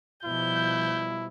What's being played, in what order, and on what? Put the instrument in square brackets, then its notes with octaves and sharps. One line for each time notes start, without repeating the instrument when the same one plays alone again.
[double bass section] B2 F3 G3 [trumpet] E4 [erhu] G6